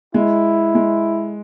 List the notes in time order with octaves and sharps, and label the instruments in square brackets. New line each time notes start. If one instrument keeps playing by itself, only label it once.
[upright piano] G#3 [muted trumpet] E4
[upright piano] G#3